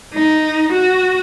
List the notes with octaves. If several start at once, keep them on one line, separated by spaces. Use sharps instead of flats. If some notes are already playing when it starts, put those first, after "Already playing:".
D#4
F#4